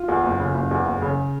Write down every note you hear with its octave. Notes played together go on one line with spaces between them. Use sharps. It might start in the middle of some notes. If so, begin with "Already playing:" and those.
Already playing: F4
E2
F#1
C#3
F#1
E2
F#1
C#3